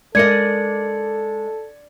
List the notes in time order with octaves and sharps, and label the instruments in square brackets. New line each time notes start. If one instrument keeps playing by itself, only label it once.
[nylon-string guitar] G#3 A#4 D#5 [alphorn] A4 [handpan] D5 [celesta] G#6 C#7